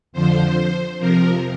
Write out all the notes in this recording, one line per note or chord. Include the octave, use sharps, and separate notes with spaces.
F2 D3 F3 C5
F2 C3 F3 A#4